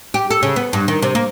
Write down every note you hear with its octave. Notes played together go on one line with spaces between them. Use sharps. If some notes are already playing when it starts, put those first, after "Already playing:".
G4
A4
C#3
B3
G2
D#3
C3
A#3